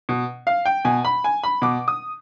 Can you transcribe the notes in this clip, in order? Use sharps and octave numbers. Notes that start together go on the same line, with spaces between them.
B2
F5
G5
B2 G#5
B5
G#5
B5
B2 D6
D#6